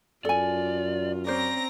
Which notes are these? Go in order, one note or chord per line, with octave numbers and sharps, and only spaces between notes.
F#2 F4 A4 D5 G#5
C4 C#4 C5 D5 A#5 A#6